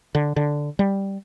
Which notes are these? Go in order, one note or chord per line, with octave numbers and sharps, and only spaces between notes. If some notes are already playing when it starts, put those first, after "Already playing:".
D3
D3
G3